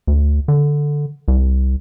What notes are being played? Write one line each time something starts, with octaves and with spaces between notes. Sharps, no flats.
D2
D3
C2